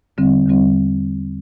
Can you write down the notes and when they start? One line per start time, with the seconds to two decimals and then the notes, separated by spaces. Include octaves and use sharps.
0.17 E2 D3 G3 C4
0.47 E2 D3 G3 C4